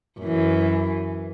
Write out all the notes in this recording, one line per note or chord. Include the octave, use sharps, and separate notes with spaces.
F#2 E3